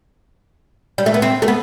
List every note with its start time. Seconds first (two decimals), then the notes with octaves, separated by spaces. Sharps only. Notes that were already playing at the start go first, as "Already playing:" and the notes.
0.98 G3
1.06 A3
1.14 B3
1.22 C4
1.42 A3
1.48 B3